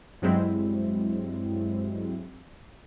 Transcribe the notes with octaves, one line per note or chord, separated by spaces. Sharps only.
G2 F#3 G#3 C4 E4